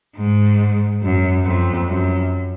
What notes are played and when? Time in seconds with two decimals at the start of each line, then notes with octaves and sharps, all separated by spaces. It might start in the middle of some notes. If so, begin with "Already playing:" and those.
0.17 G#2
1.02 F#2
1.45 F2
1.87 F#2